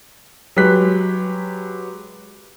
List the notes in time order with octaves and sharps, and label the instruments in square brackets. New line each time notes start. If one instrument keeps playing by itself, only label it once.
[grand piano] F#3 G#3 G4 B4 F#6 B6